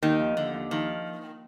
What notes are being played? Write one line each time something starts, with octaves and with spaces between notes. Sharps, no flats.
D#2 D#3
F3
D#2 D3
D#2
D#3 F3